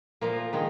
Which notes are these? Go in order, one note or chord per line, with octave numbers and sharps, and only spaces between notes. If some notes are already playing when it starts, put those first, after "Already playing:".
A#2 F3 A#3
D#3 G#3